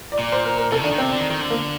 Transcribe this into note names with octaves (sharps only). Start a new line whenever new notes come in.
D5
A#2
C5
A#4
A#4
C3 A4
D#3
D4
D#3
C3 C4
D3
D#3
D#3
D3
A#3